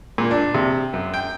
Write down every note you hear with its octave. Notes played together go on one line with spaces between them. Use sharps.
A#2
D4
C3
F#2
G5